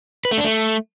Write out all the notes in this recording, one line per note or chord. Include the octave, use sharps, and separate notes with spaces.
B4
A3
D4
A3